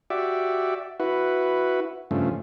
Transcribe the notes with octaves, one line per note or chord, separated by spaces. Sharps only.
F#4 G4 D5 E5
E4 F#4 B4
G2 C#3 F3 A3